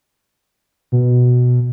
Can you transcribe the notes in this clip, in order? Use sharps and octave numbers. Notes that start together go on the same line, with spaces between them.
B2